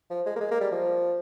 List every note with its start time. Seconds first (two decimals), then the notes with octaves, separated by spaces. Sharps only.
0.10 F3
0.26 G#3
0.36 A#3
0.40 G#3
0.51 A#3
0.61 G3
0.72 F3